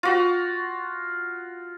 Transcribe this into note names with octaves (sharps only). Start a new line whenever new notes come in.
F4 F#4